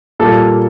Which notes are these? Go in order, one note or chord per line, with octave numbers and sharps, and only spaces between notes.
A#2 G3 A#3 A4